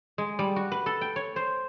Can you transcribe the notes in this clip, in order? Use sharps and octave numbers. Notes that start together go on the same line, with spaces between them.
G#3
G3
F#4
B4
A4
G5
C#5
C5